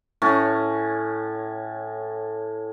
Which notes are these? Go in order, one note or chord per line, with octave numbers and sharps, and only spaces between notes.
A2 C#4